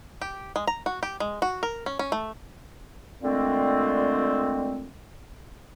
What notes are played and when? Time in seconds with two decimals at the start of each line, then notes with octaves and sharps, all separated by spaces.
0.21 G4
0.56 G#3
0.67 A#5
0.86 F#4
1.03 G4
1.20 G#3
1.42 F#4
1.63 A#4
1.86 C#4
1.99 C#4
2.12 A3
3.22 A#2 D3 G#3 A3 C4